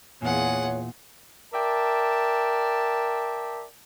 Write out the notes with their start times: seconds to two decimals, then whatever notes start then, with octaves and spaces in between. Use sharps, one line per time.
0.22 E2 A#2 F4 G#4 C#5 F#5
1.54 A#4 D5 E5 G5 A5